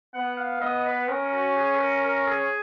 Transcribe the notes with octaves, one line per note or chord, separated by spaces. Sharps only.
B3 F#5
F5
B3 D#5
B4
C#4 A#4
F#4
G#4
B4
A#4
A#4
G#4